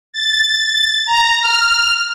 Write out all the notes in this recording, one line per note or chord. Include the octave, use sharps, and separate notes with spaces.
A6
A#5
F6